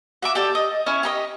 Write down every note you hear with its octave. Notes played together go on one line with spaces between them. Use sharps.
F#4 E5 D6
G4 A4 D5
D#5
C#4 E4 C#5
G4 A#4 D#5